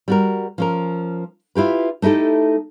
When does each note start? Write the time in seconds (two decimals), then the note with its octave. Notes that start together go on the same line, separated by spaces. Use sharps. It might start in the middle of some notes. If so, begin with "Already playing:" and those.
0.08 G3 F#4 A#4
0.58 F3 C#4 A#4
1.55 E4 F4 G4 B4
2.02 A3 D#4 E4 G4 A4